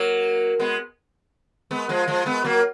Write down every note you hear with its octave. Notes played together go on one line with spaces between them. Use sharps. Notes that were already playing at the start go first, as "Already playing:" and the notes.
Already playing: F#3 A#3
G#3 B3
G#3 B3
F3 G#3
F3 G#3
G#3 B3
F#3 A#3